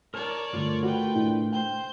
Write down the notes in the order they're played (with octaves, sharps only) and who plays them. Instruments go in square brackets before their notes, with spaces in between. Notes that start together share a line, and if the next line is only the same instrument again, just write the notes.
[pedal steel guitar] A#4 A5 A#5 [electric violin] C#5 D5
[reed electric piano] G2 D3 [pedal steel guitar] A3 F4 A#4
[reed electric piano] F#4 [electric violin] B4 G5
[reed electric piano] A2 D4 E4
[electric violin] C5 G6 [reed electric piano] G5